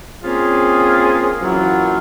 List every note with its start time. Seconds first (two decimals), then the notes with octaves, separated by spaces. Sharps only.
0.23 A#3 C4 C#4 F4 G#4
1.42 F#2 E3 F#3 A#3 F4